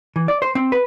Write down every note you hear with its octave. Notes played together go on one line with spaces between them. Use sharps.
E3
D5
C5
C4
B4